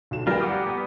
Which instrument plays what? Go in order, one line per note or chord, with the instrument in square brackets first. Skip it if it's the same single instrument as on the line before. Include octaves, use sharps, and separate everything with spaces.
[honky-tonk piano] B1 F#4 E7
[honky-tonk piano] G3 B4 G5 [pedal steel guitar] F4 A#4
[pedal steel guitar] F#5 D6 D#6
B3 D#6